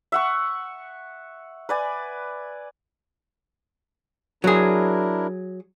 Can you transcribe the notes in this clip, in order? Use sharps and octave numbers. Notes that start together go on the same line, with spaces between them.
E5 F#5 C#6
B4 D5 G#5
F#3 D4 E4 G#4 A#4